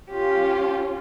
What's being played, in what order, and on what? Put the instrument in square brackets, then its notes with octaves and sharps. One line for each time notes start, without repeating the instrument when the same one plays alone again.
[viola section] C#4 F4 [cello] G4